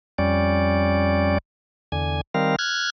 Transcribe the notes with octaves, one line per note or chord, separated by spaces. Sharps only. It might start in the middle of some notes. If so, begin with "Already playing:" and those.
F2 G3 C#4 D5
E2 D3 G#5
D#3 G3 C4 A#4 F5
F6 F#6 G#6